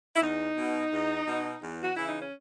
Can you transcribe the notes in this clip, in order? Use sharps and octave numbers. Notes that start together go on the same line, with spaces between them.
E4
E2 D#4
B2
E2
B2
E2
F#4
C#3 E3 E4
D#4
C#4